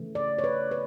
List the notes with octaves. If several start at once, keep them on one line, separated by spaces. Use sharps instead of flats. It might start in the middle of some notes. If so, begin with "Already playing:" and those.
Already playing: C#3 E3 A3
D5
C#5
B4
B4